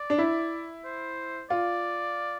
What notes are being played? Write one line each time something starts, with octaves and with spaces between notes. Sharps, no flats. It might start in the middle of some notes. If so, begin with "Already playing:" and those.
Already playing: D5
D4
E4
C5
F4 D5